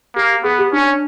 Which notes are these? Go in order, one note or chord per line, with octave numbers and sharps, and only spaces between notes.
A#3 G4
B3 G#4
G4
C#4 D4